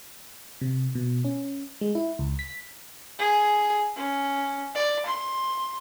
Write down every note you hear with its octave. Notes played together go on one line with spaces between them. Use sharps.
C3
B2
C#4
G#3
E4
C#2
B6
G#4
C#4
D5
C6